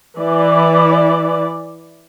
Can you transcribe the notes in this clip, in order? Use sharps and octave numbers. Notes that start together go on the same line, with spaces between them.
E3 D5